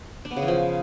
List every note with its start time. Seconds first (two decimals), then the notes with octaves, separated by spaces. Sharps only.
0.25 D4
0.31 B3
0.36 C#3
0.42 E3
0.48 F3